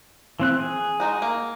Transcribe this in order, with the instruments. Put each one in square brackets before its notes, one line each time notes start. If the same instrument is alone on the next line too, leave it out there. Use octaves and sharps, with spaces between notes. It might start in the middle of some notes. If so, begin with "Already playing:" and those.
[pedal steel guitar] E3 C4 F#6
G#4
[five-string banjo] G#3 D#4 F#4
A#3